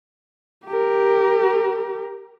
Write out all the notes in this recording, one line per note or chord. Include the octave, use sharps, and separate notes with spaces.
G4 A#4